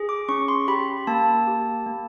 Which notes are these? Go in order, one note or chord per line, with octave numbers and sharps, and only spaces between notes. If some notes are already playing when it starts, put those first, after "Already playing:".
Already playing: G#4
D6
C#4 C#6
C6
G4 B5
A#3 A5
G4
A#3